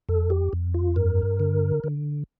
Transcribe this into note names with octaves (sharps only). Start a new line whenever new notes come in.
F2 A4
G4
F2
F4
G2 A#4
D3
D3